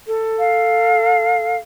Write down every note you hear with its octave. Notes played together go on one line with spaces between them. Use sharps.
A4
F5